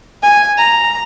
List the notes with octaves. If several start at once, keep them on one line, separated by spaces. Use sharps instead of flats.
G#5
A#5